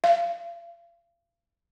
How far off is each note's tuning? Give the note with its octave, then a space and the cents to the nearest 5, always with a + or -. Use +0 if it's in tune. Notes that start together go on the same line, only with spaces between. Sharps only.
F5 -40